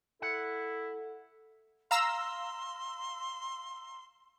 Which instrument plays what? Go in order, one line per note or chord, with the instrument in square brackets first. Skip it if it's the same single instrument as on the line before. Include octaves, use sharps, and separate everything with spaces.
[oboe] E4 [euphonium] A4 [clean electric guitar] F#5
[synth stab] F5 A#5 E6 [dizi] C6